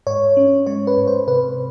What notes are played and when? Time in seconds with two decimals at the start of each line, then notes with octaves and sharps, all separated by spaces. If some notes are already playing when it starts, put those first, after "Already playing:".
0.07 G#2 C#5
0.37 C#4
0.66 G#3 C#5
0.87 B4
0.97 G#2
1.07 C5
1.28 C3 B4